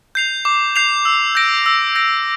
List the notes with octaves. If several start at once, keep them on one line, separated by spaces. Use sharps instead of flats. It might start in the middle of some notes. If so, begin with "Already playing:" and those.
G6 C7 F7
D6
G6 C7 F7
E6
G6 A#6 D7
E6
G6 A#6 D7